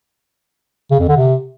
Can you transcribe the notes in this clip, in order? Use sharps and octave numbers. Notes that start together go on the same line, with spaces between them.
C#3
F2
D3
C3